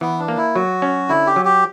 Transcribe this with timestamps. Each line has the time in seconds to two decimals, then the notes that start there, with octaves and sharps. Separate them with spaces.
0.01 E3 B3
0.19 D4
0.28 A#3
0.37 E4
0.55 F#3 F#4
0.82 C#4
1.09 D3 E4
1.27 G4
1.36 F#3
1.45 G4